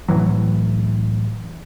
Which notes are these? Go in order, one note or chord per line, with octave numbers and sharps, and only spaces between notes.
C2 A2 E3 F#3